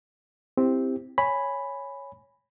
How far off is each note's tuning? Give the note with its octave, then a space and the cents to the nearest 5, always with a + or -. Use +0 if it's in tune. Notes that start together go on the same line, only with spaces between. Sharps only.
C4 +0 E4 +0 G4 +10
C#5 +0 G#5 +0 B5 +0